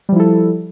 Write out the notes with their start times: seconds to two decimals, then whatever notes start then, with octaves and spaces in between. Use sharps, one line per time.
0.09 G3
0.12 F3
0.16 E4
0.20 A4